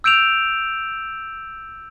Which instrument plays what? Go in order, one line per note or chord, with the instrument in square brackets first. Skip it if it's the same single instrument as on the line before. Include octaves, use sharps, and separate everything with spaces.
[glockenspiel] E6 G6 D7 E7 F7